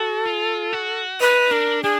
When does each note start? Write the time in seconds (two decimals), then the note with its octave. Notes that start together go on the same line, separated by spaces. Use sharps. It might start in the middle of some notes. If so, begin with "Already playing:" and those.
Already playing: F#4 A4
0.26 F4
0.73 F#4
1.20 D#4 B4
1.51 D4 A#4
1.83 D4 G#4